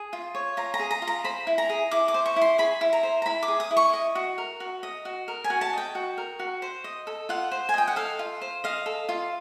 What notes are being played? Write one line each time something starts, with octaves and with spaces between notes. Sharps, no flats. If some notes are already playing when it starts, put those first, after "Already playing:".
Already playing: G#4
F4
C#5
F4 A#5
A#5
G#4
A#5
F4
A#5
C5 B5
E4
A#5
G#4
E4 D6
D6
C5
C#6
E4
C6
G#4 B5
E4
A#5
C5
A#5
E4 B5
D6
G#4
D#6
E4
C#6
D#5
F#4
A#4
F#4
D#5
F#4
A#4
G#5
F#4
A5
D#5 G5
F#4
A#4
F#4
C5
D#5
A4
F4 F#5
C5
G#5
D#5 G5
F#5
A4 F5
F4
C5
D#5 F5
A4
F4